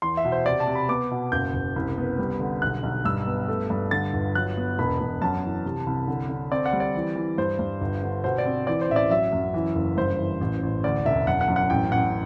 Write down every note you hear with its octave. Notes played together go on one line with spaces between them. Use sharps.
E2 C6
E5
B2
C5
C3 D5
A5
C3
B5
B3 D6
B2
F#1 G6
F#1
C2
B3
G3
D3
B1 F#6
B1
G2 E6
B3
A3
G2
D3 A6
G1
F#3 F#6
B3
E1 B5
E1
F#2 A5
E3
C3
C2
D3
D3
C4 D5
F#5
G3
D5
E3
E3
G2 C5
G2
G1
D3
B2 C5
D5
C4
E3 D5
C5
A1 E5
D5
F#3 E5
F#2
E3
F#1
G2 C5
E3
A1
A1
D2 D5
E1 E5
F#2 F#5
F#5
F#2
F#5
A1 G5
A1 F#5